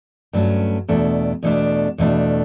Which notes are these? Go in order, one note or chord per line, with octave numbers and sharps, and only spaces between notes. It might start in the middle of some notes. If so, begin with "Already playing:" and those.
G2 F#3 A3 C#4
E2 B2 A3 D4
E2 B2 A3 D4
E2 B2 A3 D4